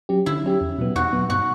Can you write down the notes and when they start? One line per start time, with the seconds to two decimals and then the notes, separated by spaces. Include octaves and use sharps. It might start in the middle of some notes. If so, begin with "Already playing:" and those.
0.09 F#3 C#4 G4
0.26 D3 E4
0.44 F#3 C#4 G4
0.61 E2
0.78 B2 F#3 B3
0.96 E2 F#4
1.12 B2 F#3 B3
1.29 G2 F#4